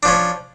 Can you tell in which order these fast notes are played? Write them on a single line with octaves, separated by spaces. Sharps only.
D4 F3 C#4